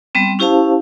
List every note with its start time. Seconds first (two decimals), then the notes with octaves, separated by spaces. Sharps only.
0.15 G3 B3 C4
0.39 C#4 E4 G4 C5 F5 A5